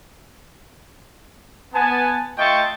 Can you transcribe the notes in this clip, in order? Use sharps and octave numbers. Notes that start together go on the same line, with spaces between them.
B3 G#5 A5
A3 F4 D#5 G5 A5 C#6